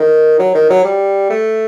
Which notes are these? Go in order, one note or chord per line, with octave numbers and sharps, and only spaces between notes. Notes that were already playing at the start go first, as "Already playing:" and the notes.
Already playing: D#3
F#3
D#3
F#3
G3
A3